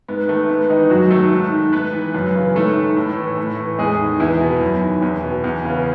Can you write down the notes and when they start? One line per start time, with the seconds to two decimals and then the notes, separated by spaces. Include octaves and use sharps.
0.08 G#2 B3
0.28 D#3 A3
0.49 G#2 B3
0.69 D#3 E3 D#4
0.90 F#2 F#3 F#4
1.11 D#3 A3 A4
1.32 G#2
1.52 D#3
1.73 G#2 B3 B4
1.93 E3
2.15 F#2
2.35 C#3 E3
2.55 G#2 A3 A4
2.76 D#3
2.96 A2
3.17 E3
3.38 A2
3.58 E3
3.79 E2 G#3 G#4
3.99 D#3
4.20 E2 E3 E4
4.41 B2
4.61 F#2
4.82 D#3
5.02 E2
5.23 B2
5.44 E2
5.65 C#3 E3